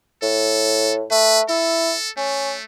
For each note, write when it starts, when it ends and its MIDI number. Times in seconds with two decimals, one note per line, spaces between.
0.22 1.05 45
0.22 0.93 69
1.11 1.42 57
1.11 1.39 71
1.49 1.93 64
1.49 2.09 69
2.17 2.63 57
2.17 2.53 61